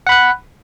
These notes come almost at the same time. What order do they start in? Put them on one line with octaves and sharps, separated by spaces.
F#5 B5 F#6